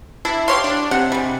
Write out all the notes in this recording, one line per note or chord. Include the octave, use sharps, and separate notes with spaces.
D4 E4
G4 C#5 F5 C6
D4
C3 F#5
G3 G#3